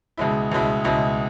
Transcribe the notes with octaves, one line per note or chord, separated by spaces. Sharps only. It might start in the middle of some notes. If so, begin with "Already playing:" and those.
C#2 B2 G#3 E4
C#2 B2 G#3 E4
C#2 B2 G#3 E4